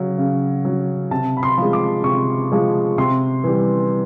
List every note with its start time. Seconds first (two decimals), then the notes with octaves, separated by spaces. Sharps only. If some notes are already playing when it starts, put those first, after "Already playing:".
Already playing: C#3 F#3
0.18 C#3
0.65 F#3
1.11 C3 A5
1.37 B5
1.43 C6
1.58 F3 G#3
1.73 D6
2.04 C3 C#6
2.52 F3 G#3
2.98 C3 C6
3.44 E3 G3